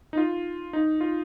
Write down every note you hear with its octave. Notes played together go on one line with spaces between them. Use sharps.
D#4
F4
D#4
F4